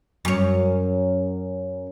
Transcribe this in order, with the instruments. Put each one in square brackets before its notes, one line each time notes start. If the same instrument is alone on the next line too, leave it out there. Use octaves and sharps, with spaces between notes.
[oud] F#2 C#5